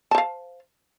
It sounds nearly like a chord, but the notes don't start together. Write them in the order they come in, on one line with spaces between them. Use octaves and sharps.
A5 C5 F5